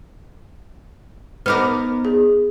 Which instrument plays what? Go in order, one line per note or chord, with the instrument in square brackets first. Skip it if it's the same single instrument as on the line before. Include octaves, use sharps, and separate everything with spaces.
[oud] B3 D#4 A#4 [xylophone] D6 F6
[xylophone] G#4